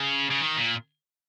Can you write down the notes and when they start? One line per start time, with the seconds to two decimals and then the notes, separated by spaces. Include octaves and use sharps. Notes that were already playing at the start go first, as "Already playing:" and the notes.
Already playing: C#3
0.30 C#3
0.41 D#3
0.56 A#2